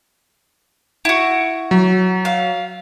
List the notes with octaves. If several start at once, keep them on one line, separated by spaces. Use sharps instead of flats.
E4 F#4
F#3
F5